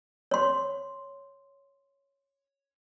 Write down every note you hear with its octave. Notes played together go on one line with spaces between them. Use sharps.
C#5 C6